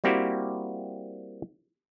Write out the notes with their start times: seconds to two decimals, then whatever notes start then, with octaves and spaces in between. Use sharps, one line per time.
0.04 G3 A#3 C4 E4 F#4 G4